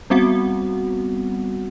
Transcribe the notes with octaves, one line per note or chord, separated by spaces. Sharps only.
G3 B3 C4 F#4 F#5